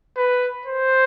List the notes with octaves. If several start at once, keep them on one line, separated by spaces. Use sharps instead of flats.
B4
C5